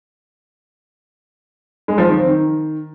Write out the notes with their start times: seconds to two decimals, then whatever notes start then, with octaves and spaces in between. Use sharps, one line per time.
1.88 G#3
1.98 F3
2.08 D#3
2.17 C4
2.27 D#3